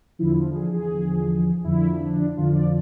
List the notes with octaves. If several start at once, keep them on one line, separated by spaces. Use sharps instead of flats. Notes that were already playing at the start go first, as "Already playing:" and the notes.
E2 D3 F3 E4
F4
G#4
G#4
E2 D3 F3
F2 D3 F3 E4
D4
F2 D3 F3 F4
D5